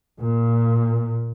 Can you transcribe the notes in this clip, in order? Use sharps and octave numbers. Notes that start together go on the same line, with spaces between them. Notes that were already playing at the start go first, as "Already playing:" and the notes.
A#2